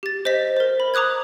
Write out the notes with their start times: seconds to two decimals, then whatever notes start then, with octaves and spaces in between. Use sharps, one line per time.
0.03 G4 A6
0.25 C5 D#5 B6
0.57 A#4 C5
0.80 B5
0.94 A#5 D6 D#6 F#6 G#6